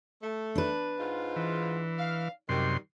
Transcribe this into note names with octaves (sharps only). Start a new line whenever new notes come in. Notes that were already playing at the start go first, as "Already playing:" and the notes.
A3
D4 B4
G#2 F4
E3
F5
F#2 C3 D#3 G3 C6